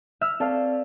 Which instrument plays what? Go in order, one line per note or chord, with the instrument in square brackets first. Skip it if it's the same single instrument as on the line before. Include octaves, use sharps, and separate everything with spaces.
[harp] E5 E6 F6
[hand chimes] C4 D5 A5 [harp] A4 F5